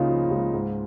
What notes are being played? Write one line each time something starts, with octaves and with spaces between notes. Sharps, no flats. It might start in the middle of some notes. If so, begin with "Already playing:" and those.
Already playing: C#2 C#3 A#3 D#4 F4
F3
F4
C#2
G#2